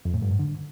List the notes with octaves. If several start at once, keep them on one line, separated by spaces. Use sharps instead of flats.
F2
A2
G2
G#2
D3